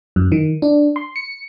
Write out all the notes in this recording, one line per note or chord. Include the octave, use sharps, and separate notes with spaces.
F#2
D#3
D4
C6
C#7